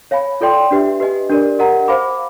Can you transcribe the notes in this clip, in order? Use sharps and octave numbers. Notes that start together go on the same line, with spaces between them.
C#5 F5 G#5 B5
F4 A4 D5 G5 C6
D4 G4 B4 E5
G4 B4 D#5 G#5
D4 G4 A#4 D5
G4 A#4 D#5 F#5 A#5
C5 F5 G#5 B5 D6